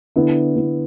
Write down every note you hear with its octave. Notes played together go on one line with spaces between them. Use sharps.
D3 B3 E4
D3 B3 E4